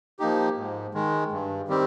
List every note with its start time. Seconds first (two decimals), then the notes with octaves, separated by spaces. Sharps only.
0.20 F3 A#3 D#4 G4
0.57 G#2
0.94 D#3 G#3
1.32 G2
1.68 D#3 G3 C4 G4